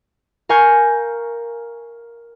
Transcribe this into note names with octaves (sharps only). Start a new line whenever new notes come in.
A#4 F5 G#5 C#6 G6